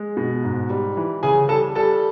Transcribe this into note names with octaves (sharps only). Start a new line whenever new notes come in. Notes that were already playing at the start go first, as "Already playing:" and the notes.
Already playing: G#3
B2
G#2
G3
E3
C#3 G#4 G#5
G3 A4 A5
G3 A4 A5